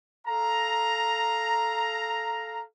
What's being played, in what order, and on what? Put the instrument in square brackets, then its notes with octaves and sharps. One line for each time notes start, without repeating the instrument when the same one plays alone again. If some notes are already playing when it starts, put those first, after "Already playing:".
[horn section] A4 F5 A#5